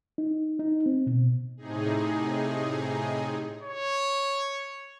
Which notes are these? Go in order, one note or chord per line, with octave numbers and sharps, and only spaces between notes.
D#4
D#4
C4
B2
A2 C3 D#4 G#4
C#5